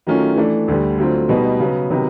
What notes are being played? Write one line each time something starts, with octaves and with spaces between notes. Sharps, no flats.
D#3 F#3 A3 C#4 F4
E3 A3 D4
D2 D3 G3
D3 F#3 A3 C4 F4
B2 G3 B3 D#4
C#3 F#3 B3
C3 D#3 F#3 B3